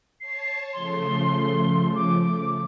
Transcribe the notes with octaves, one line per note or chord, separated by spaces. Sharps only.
C#5 A5 C7
C#3 F3 A3 C6
D6